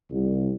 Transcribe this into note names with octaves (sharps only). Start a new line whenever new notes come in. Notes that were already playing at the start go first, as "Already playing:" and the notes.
C2